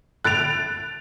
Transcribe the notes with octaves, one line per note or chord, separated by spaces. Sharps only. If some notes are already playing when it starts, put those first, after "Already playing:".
F#6 A6 D7 F7